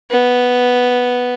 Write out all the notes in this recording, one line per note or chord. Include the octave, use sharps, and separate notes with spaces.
B3